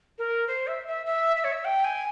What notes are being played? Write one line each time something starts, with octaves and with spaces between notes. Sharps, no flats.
A#4
C5
E5
E5
E5
E5
C#5
E5
G5
G#5